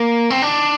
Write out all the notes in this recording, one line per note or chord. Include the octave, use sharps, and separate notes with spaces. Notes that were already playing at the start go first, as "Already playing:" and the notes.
Already playing: A#3
C4
D4